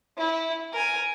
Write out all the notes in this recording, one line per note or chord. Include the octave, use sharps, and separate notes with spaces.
E4
A#4 G#5